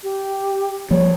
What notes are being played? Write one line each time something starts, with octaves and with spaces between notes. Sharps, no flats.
G4
F3 G3 A#3 C#5